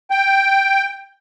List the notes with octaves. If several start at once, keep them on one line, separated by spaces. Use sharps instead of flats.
G5